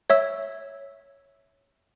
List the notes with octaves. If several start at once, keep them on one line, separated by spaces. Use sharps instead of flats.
C#5 E5 E6